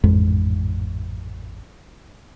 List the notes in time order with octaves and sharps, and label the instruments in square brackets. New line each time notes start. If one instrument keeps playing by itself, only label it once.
[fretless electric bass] A1 F2 G#2 G#3